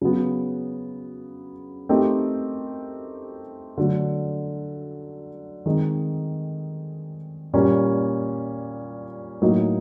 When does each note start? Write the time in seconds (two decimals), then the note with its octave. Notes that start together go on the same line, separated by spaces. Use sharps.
0.01 C#3 F#3 B3
1.89 A3 C4 D#4 G4 A#4
3.77 D3 F#3 A3 D4
5.66 D#3 G#3 C4 D#4
7.53 A#2 G3 A#3 C#4
9.42 A2 F#3 A#3 D#4